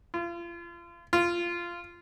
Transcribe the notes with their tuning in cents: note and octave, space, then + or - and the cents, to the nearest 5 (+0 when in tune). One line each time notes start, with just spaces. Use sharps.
F4 -35
F4 -15